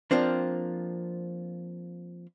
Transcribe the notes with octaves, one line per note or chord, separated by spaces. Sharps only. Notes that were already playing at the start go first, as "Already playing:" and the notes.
F3 A#3 C4 D4